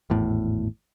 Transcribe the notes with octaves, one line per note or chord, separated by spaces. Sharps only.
G#1 E2 A2